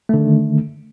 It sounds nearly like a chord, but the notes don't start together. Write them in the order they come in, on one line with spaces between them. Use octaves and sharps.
A3 D3 D#3